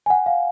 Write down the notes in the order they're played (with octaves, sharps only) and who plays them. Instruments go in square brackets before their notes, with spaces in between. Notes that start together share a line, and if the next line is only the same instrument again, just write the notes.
[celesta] G#5
F#5
F5